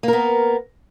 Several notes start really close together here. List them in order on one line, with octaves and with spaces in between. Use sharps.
A#3 A#4 B3